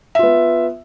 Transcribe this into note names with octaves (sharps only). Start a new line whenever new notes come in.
B3 F4 E5